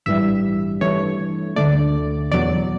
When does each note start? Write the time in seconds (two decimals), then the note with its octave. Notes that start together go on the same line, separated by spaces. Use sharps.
0.06 A1 G2 E3 G3 E5
0.81 G2 E3 A3 C#5
1.56 D2 D3 A3 D5
2.32 E2 B2 F#3 D5